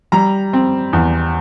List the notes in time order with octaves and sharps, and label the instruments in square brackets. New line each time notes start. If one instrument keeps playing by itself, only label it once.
[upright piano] G3 A#5
C4
E2